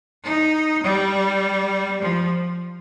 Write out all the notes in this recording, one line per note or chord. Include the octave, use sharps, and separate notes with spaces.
D#4
G3
F3